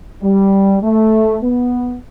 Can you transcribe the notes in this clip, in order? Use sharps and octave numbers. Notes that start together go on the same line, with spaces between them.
G3
A3
B3